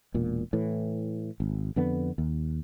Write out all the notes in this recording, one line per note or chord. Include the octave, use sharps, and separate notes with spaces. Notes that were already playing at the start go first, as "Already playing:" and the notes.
E1 A#2
A2 E3
G#1
F2 D3 B3
D#2